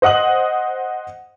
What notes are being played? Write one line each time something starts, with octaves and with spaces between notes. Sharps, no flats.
C5 D#5 F#5 D#6 F#7